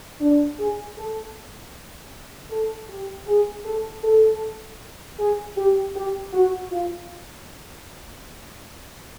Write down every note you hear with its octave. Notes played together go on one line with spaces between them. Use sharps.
D4
G#4
A4
A4
G4
G#4
A4
A4
G#4
G4
G4
F#4
F4